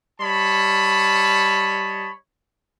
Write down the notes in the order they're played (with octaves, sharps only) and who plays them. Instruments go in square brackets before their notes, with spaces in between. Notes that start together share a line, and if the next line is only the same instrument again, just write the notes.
[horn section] G3 C#5 D#5 A5 B5